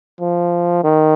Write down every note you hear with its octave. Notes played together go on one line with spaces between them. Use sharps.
F3
D#3